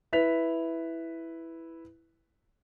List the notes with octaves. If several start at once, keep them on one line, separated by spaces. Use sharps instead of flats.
E4 B4 B6 F7